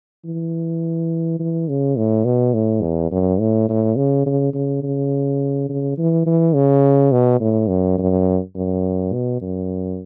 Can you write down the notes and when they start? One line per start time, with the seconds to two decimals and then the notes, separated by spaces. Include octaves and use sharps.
0.25 E3
1.39 E3
1.68 C#3
1.97 A2
2.25 B2
2.54 A2
2.82 E2
3.12 F#2
3.40 A2
3.69 A2
3.97 C#3
4.26 C#3
4.54 C#3
4.83 C#3
5.69 C#3
5.98 E3
6.26 E3
6.55 C#3
7.12 B2
7.40 A2
7.69 F#2
7.98 F#2
8.55 F#2
9.13 B2
9.41 F#2